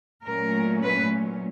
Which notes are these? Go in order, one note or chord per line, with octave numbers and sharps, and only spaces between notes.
A#2 F#3 A3 C#4 A#4
B4